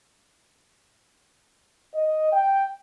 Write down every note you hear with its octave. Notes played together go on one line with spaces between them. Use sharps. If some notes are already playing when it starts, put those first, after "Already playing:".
D#5
G5